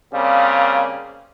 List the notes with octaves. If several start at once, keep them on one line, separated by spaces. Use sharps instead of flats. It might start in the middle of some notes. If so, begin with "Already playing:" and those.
C#3 G3 A#3 C4